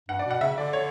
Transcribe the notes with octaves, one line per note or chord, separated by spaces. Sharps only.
G2 F#5
D5
B2
F#5
C#3 E5
D3 D5
C#5